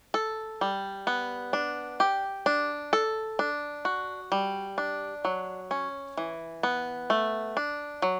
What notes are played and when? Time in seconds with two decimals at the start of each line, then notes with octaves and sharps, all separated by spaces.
0.14 A4
0.61 G3
1.07 B3
1.53 D4
2.00 G4
2.46 D4
2.93 A4
3.39 D4
3.85 F#4
4.32 G3
4.78 D4
5.25 F#3
5.71 C#4
6.17 E3
6.63 B3
7.10 A3
7.57 D4
8.02 F#3